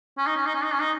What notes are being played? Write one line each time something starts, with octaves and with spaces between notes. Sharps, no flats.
C#4
D#4
C#4
D#4
C#4
D#4
C#4
D#4